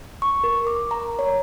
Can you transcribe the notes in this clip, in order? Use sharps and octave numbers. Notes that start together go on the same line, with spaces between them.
C#6
A#4
D6
A#5
C#5